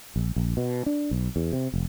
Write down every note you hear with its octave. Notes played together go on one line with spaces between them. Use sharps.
A#1
A#1
B2
D4
B1
E2
C3
F1